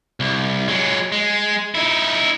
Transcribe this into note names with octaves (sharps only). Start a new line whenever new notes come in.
C2
F#3 G#3
G#3
D#4 E4